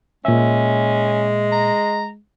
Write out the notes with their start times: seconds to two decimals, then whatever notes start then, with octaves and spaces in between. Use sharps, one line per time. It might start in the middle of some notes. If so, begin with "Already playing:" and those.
0.25 A#2 G#3 C#4 E5
1.52 A#5